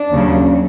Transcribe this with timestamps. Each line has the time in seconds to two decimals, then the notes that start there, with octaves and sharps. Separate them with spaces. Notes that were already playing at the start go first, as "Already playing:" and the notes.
Already playing: D4
0.11 D#2 C#3 F#3